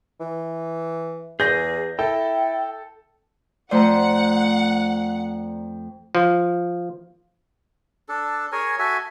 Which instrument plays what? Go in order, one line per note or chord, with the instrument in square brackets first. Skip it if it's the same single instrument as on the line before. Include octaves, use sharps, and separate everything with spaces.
[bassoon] E3
[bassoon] E2 [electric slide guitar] G#4 [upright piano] G6 A#6
[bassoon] E4 [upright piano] A4 [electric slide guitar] G5
[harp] F2 A3 C5 [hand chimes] D5 A#5 [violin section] F#5
[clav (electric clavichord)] F3
[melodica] D4 A4
G#4 A#4 C#5 G#5
F#4 A4 E5 G#5